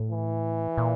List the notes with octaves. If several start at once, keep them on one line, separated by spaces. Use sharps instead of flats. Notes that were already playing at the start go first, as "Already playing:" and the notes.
Already playing: A2
E3
A#2